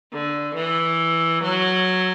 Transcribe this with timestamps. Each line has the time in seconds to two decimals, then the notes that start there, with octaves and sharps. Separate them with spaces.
0.13 D3
0.55 E3
1.43 F#3